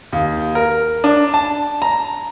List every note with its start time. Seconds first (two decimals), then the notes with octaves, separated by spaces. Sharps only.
0.13 D#2
0.55 A#4
1.04 D4
1.34 A5
1.82 A#5